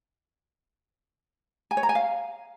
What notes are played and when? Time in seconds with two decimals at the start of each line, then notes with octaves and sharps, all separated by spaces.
1.71 G#5
1.77 C#5
1.83 A#5
1.89 G#5
1.95 F5